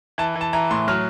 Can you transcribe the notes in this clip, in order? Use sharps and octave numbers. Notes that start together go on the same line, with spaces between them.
E3 A5
E3
A5
E3 A#5
A2 C6
F#3 F6